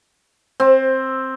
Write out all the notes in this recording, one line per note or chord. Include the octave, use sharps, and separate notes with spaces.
C4